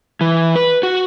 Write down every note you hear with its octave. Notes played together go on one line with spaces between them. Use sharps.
E3
B4
F#4